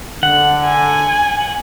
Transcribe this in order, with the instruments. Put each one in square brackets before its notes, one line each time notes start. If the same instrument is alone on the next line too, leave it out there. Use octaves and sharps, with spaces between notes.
[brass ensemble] D3 [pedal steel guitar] F#5
[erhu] G#5